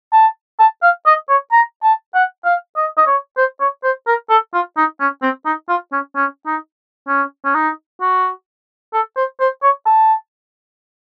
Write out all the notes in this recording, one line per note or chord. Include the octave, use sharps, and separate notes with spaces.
A5
A5
F5
D#5
C#5
A#5
A5
F#5
F5
D#5
D#5
C#5
C5
C#5
C5
A#4
A4
F4
D#4
C#4
C4
D#4
F4
C#4
C#4
D#4
C#4
C#4
D#4
F#4
A4
C5
C5
C#5
A5